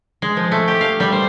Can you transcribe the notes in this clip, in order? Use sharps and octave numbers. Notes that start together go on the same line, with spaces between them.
G#3
F3
A3
G4
F5
G3
C5